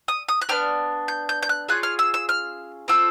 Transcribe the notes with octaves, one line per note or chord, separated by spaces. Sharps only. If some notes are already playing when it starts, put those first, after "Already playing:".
D#6
D#6
F#6
B3 D4 G4 F6
G6
G6
G6
F#6
C#4 F4 G#4 F#6
F6
E6
E6
F6
C4 F4 A4 E6